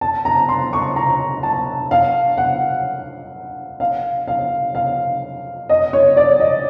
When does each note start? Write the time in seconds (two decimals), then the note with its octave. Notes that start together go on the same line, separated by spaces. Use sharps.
0.01 A5
0.25 A#5
0.49 C6
0.73 C#6
0.96 A#5
1.43 A5
1.91 F5
2.38 F#5
3.80 F5
4.28 F5
4.75 F5
5.69 D#5
5.93 C#5
6.17 D5
6.40 D#5